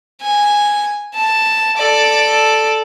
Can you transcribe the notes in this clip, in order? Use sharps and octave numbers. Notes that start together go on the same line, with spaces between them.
G#5
A5
A4 D5